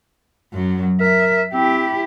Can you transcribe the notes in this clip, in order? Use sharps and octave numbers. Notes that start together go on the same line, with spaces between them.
F#2 F#3
A#4 E5
C4 E4 G4